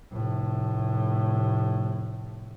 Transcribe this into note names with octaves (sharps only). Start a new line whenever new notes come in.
F1 A2